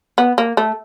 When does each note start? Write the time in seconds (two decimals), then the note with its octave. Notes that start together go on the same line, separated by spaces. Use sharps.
0.18 B3
0.38 A#3
0.57 A3